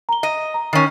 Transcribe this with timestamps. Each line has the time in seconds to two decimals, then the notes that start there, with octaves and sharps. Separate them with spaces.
0.09 A#5 G7
0.23 D#5
0.54 A#5
0.73 D#3 C#4